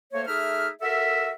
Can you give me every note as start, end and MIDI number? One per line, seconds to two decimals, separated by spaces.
0.13 0.25 57
0.13 0.25 58
0.13 0.25 72
0.13 0.25 73
0.26 0.69 57
0.26 0.69 63
0.26 0.69 68
0.26 0.69 76
0.26 0.69 89
0.81 1.31 66
0.81 1.31 69
0.81 1.31 70
0.81 1.31 76